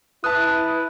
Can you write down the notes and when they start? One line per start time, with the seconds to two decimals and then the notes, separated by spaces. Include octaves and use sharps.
0.24 E4 B4 A5 D#6 F#6